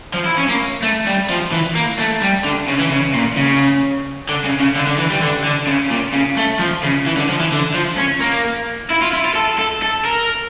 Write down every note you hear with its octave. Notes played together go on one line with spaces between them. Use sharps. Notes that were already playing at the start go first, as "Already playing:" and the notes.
F3
E4
C#4
A#3
A3
G3
F3
E3
A#3
A3
G3
D3
C#3
E3
C#3
A#2
C#3
D3
C#3
C#3
D3
D3
E3
G3
D3
D3
C#3
A#2
C#3
A3
F3
C#3
E3
D3
F3
E3
D3
F3
C#4
A#3
E4
F4
E4
F4
A4
A4
A4
A#4